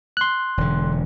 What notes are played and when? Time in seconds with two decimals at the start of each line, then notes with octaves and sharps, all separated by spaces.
0.17 C6 F#6
0.57 E1 D3